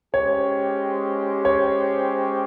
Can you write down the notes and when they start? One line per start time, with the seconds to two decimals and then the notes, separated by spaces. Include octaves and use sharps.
0.14 G#3 C#4 G4 C5 C#5 G5
1.45 C#5